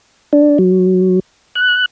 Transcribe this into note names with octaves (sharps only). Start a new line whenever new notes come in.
D4
F#3
F#6